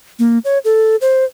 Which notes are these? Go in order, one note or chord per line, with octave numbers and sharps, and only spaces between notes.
A#3
C#5
A4
C5